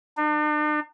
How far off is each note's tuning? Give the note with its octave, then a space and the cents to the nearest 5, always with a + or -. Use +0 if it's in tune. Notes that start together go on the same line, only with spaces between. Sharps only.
D4 +45